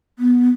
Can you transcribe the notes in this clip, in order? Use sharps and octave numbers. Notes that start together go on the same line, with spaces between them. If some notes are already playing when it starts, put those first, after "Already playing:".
B3